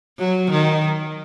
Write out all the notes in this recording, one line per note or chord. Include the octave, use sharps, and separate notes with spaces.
F#3
D#3